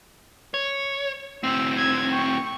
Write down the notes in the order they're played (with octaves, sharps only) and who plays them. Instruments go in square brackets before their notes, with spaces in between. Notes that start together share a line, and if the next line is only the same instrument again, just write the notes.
[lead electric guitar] C#5
[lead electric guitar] A2 C4 [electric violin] E6
[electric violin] E6 G#6
G5 C#6